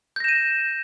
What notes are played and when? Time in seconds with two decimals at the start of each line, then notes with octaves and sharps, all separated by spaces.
0.16 G6
0.20 A#6
0.24 E7
0.28 D#7